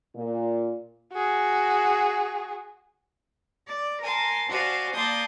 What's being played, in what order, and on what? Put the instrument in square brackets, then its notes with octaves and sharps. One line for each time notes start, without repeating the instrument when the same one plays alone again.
[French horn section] A#2
[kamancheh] F#4 G#4
[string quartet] D5
A#4 G#5 A5 C6
F#4 C5 D5 F5 G#5
A#3 D5 A5 C6 D#6 G6